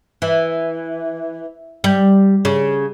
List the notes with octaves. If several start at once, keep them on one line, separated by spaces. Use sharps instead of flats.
E3
G3
C#3